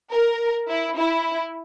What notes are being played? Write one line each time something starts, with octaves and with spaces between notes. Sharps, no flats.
A#4
E4
E4